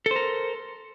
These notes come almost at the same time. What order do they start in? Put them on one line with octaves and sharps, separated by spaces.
A4 C5 A#4